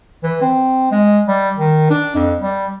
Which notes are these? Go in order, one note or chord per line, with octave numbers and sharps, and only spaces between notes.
E3
C4
G#3
G3
D#3
D4
F2
G3